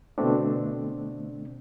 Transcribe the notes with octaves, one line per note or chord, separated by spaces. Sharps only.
B2 D3 A3 C4 D4